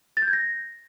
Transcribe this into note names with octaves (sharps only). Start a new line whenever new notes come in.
A6
G6
G#6
A#6